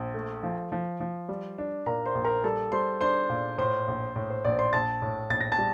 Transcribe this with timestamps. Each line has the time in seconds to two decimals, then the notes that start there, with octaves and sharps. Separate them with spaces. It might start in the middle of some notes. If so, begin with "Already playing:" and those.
Already playing: A#1 C5
0.14 A3
0.43 F3
0.72 F3
1.00 F3
1.29 G3
1.58 D4
1.86 A#2 A#4 A#5
2.06 C5 C6
2.15 A#1
2.25 A#4 A#5
2.44 G3 A4 A5
2.72 G3 C5 C6
3.01 D4 C5 C6
3.29 A#2
3.58 A2 C5 C6
3.88 A#1
4.16 A2
4.30 C5
4.45 A#1 D5
4.58 C5 C6
4.72 A#1 A5 A6
5.02 A2
5.30 A#1 A6
5.41 A#6
5.52 A5 A6
5.58 G3